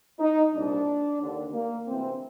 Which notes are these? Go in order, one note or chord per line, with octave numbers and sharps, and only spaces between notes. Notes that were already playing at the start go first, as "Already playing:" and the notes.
D#4
C2 A#2 D4
D#2 D3
A#3
D2 C3 E3 C4